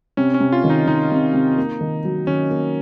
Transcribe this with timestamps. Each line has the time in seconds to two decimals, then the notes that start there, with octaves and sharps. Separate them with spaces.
0.17 C3 C#4
0.34 C#4
0.41 C3
0.52 F4
0.64 D#3
0.70 D#4
0.87 D#3 D#4
1.11 C3
1.33 C3
1.57 A#3
1.81 D#3
2.05 F#3
2.27 D#3 C#4
2.50 A#3